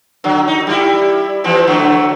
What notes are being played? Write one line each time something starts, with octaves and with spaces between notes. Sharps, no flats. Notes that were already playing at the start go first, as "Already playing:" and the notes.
D3 F#3
D#4
G3 E4
E3 F3 C4
D3 F#3 A3